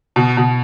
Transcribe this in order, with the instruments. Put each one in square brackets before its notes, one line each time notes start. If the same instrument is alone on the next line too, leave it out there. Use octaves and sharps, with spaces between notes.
[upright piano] B2
B2